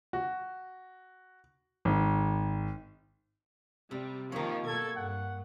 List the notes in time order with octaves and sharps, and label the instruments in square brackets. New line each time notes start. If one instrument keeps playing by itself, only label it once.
[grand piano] F#4
G#1
[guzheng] C3 [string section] G3
[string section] D#3 F3 [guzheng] A#3 C#5
[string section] B2 G#6 [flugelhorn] A4
[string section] G2 [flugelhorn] F#5